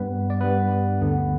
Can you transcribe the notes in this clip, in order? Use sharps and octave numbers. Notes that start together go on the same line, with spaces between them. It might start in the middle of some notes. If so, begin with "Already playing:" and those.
Already playing: G2 G3 B3 B4
D5
G2 G3 B3 B4
D2 D3 B3